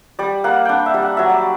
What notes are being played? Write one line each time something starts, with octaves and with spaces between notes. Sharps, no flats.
G3 D5
A#3 F#5
D4 F#5 G5
E5
G3
F#5
F#3 E5
D5